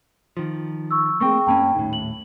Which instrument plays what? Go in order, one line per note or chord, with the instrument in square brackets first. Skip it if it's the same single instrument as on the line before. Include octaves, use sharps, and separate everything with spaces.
[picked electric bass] D#3 F3
[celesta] C#6 E6
[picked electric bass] A3 A#3 C4 [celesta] G#4 G5 C#6
[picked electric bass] F#2 A#3 C#4 [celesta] G5 A5 B5
[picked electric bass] D#1 A2 [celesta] D#4
[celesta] F#7